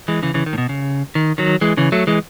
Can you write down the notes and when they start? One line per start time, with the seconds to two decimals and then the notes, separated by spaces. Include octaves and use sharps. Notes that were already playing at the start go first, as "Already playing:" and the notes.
0.08 E3 G#3
0.23 C#3 E3
0.34 C#3 E3
0.46 D#3
0.53 A2
0.58 B2
0.69 C#3
1.15 D#3
1.38 D#3 F#3
1.61 E3 G#3
1.77 C#3 E3
1.92 F#3 A3
2.07 E3 G#3